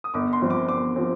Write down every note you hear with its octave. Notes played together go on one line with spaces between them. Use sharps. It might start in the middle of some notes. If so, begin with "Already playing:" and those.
D#6
G1 D6
C6
G2 F3 C4
D6
G1 D6
F3 C4